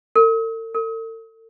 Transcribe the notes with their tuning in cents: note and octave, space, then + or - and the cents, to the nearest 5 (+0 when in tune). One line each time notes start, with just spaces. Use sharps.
A4 +45
A4 +40